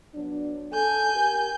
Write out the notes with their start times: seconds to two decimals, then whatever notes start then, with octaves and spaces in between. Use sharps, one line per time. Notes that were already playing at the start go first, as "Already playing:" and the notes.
0.14 F#3 B3 D4
0.72 A4 G#5 G6
1.15 G4 A#4